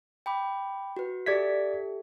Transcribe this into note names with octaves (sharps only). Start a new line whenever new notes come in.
G5 B5 D6
F#4 B4
G4 A4 D5 E5 G#6 B6